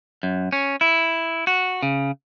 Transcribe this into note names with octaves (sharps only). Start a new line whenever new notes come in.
F#2
C#4
E4
F#4
C#3